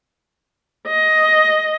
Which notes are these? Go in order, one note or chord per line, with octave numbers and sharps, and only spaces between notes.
D#5